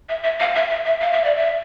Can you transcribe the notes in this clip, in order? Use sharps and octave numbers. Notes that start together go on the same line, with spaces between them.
E5
E5
F5
E5
E5
E5
F5
E5
D5
E5